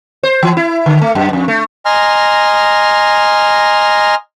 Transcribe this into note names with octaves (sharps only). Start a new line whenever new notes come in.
C5
E3
E4
D3
A3
F#2
F2
A3
D#5 G#5 A#5 C6 F6